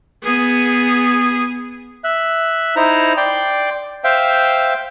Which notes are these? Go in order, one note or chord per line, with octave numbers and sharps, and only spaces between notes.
B3 G#4
E5 F#6
D#4 E4 C5 A#5
D5 G5 C6
C5 E5 F5 G5